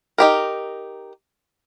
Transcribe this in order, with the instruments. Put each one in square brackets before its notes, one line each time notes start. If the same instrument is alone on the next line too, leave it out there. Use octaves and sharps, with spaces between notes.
[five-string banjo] D#4 G4 A#4